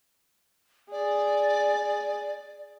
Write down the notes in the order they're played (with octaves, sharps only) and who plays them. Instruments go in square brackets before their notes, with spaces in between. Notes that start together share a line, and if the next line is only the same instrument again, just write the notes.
[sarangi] G#4 [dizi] D5